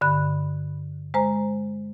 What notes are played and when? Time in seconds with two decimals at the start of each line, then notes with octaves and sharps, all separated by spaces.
0.01 G2 D3 B5 F#6
1.14 G#3 C5 A#5